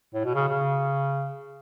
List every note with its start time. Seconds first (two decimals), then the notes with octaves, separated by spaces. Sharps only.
0.14 A2
0.25 B2
0.34 C#3
0.49 C#3